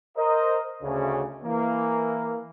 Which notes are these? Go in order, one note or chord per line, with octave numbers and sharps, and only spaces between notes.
A#4 C5 D#5
D2 C#3
E3 A#3